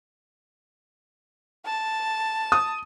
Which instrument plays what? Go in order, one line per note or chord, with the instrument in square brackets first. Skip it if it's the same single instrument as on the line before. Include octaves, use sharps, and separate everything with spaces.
[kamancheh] A5
[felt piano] D#6